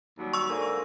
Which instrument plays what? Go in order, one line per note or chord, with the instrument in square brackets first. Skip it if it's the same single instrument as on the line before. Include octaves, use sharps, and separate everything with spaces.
[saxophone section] D#2 F#3 G3
[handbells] C#6 E6
[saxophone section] G#2 D3 A#3